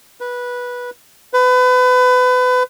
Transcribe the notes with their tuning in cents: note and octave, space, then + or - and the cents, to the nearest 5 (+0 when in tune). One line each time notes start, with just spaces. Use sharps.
B4 -15
B4 +30